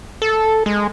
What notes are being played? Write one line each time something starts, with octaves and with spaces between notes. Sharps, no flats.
A4
G#3